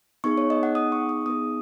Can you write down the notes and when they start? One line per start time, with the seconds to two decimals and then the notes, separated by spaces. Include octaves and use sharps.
0.24 B3 D#4 G#4 C#6
0.38 C#5
0.50 D#5
0.63 F#5
0.75 D#6
0.92 C#6
1.09 D#6
1.26 B3 D#4 G#4 D#6